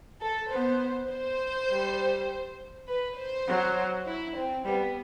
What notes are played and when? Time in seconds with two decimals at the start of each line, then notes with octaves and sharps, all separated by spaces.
0.21 A4
0.51 B3 C5
1.10 C5
1.70 G3
2.88 B4
3.17 C5
3.47 F#3
4.06 E4
4.36 C4
4.65 G3 B3